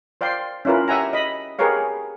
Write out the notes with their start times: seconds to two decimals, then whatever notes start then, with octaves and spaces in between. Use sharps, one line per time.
0.21 C5 D5 F5 G5 C6
0.65 C#4 E4 F4 A#4 B4
0.88 G4 E5 F#5 G#5 A#5
1.13 D#5 B5
1.59 G4 G#4 A#4 B4 C#5 F5